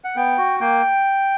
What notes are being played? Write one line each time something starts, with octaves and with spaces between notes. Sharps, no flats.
F#5
B3 G5
F#4
A#3 G5